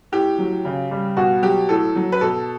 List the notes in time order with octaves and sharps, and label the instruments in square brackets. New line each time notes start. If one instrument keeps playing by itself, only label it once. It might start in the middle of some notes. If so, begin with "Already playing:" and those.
[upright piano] A2 G4
F#3
C#3
G3
B2 F#4
F#3 G4
A2 A4
F#3
B4
B2 A4